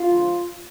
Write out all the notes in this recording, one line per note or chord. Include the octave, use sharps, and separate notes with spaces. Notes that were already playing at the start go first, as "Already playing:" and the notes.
Already playing: F4
D3 F3 G#3 D#4